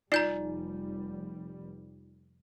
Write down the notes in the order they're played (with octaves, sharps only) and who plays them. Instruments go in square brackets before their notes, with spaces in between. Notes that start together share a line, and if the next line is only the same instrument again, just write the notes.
[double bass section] F1 G3 [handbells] D#4 F4 [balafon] D5 [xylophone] A#5 G6 C7